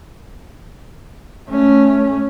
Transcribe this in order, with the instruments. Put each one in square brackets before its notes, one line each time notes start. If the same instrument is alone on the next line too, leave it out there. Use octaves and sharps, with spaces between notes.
[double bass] A3 C#4